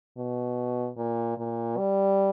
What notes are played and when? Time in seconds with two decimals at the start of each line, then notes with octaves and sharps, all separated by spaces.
0.17 B2
0.97 A#2
1.38 A#2
1.77 G3